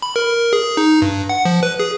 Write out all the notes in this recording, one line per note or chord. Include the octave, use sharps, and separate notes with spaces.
B5
A#4
G#4
D#4
G2
F#5
F3
B4
G#4